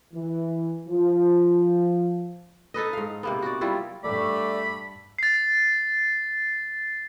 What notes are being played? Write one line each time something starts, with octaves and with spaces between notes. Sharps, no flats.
E3
F3
D#4 A4 B4 D#5
G#2 F5
C3 A#3 B3
F#4 D5
F#3 G3 E4 F4
G2 A3 D5 B5
A6 C7